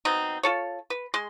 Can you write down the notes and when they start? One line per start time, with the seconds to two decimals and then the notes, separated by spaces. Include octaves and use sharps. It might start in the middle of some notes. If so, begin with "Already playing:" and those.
0.05 B2 C4 D#4
0.43 F4 A4 C#5
0.90 B4
1.14 G#3 C6